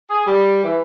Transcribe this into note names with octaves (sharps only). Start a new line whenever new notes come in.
G#4
G3
E3